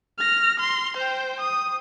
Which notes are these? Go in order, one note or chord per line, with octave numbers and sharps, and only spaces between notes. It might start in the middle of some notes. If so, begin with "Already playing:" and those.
F6 A#6
C6
C5 G5
D#6